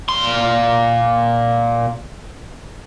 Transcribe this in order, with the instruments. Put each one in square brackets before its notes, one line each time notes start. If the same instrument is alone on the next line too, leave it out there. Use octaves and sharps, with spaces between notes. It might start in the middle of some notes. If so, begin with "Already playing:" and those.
[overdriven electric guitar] A#2 C6